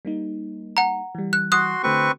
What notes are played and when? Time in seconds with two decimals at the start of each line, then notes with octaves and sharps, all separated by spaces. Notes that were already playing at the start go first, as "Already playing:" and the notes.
0.05 G3 A#3 D#4
0.77 F#5 A#5
1.15 E3 G3
1.33 F#6
1.52 F#4 C6 D#6 F#6
1.83 D3 A3 C4 F#4 B4 C#6